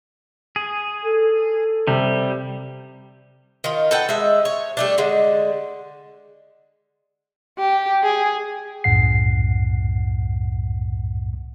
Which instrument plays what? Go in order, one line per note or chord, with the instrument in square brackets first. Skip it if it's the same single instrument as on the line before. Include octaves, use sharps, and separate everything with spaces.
[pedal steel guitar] G#4
[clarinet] A4
[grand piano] C3 [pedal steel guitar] G3
[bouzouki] D#3 F4
A4 B4 F#5 G5
G#3 E5
C#5
G3 A3 D4
D3 G#3
[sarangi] G4
G#4
[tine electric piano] C2 F#2 A2 F#5 C7